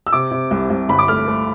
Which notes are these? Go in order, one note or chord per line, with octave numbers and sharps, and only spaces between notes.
E6
C3 D6
C3
C2
C2
G1 B5
D6
A3 F6
A3